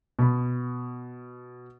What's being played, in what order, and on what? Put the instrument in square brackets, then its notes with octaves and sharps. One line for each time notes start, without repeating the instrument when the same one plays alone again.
[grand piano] B2 B5